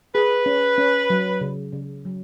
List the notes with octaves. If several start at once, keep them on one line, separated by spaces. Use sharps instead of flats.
G#4 B4
C#4
C#4
F#3
C#3
C#3
F#3